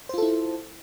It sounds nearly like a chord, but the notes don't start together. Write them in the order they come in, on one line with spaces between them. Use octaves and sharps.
C5 F4 A4 E4